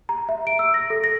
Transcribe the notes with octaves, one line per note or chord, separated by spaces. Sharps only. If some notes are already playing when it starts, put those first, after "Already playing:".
A#5
E5
D7
E6
A#6
A4
A#6